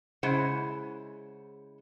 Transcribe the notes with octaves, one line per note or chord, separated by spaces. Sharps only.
C#3 G#3 E4 C5 F#5